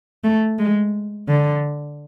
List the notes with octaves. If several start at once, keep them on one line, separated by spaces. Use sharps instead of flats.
A3
G#3
D3